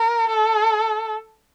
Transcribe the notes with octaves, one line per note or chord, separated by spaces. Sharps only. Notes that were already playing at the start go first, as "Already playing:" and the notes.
Already playing: A#4
A4